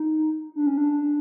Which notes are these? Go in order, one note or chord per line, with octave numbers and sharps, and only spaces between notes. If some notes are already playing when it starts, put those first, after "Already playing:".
Already playing: D#4
D4
C#4
D4